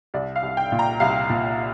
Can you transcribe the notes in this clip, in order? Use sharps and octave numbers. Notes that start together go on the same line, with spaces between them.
C2 D5
F5
C2
G5
A#2
A#5
C2 F5
A#2